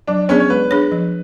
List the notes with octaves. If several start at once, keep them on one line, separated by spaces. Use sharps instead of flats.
F#3 D4
B3 C#4 D4 G#4 D5
C#5
G#3 B4
D4 G#4 C#5
F3